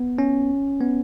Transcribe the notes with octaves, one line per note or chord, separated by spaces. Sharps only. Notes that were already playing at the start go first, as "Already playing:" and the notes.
Already playing: B3
C#4
B3